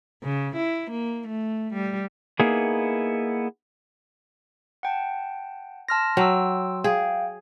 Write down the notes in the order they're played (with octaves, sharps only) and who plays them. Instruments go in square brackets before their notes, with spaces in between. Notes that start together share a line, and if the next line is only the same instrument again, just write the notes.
[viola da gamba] C#3
E4
A#3
A3
G3
[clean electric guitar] A#3 B3 D#4 E4 G#4
[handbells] F#5 G5 A5
[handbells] A5 F6 A#6 [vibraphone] C6
[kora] F#3 [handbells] G5 E6
[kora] G#4 [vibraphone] F5 [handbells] G5